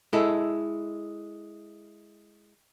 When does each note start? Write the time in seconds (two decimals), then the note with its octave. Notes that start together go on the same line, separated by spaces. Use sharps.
0.13 G#3 E4 A4